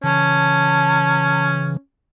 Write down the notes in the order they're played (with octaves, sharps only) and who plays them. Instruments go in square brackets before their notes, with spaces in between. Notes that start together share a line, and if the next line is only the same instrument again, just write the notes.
[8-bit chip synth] C#3 E3 [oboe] C#4 [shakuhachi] A5